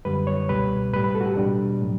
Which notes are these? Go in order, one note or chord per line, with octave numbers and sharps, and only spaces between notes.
F#2 D3 G3 B4
C#5
C#2 B2 G3 B4
A2 G3 B4
B4
A4
F#4
G4
E2 B2 G3 D4
A2 F#3